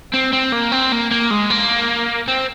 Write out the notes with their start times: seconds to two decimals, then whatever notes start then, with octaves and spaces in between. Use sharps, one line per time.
0.14 C4
0.33 C4
0.53 A#3
0.72 C4
0.92 A#3
1.11 A#3
1.30 G#3
1.50 A#3
2.28 C4